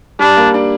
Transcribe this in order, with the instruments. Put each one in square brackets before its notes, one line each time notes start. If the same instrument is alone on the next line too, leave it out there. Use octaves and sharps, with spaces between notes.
[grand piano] G3 [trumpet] D4
[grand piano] A#3
D4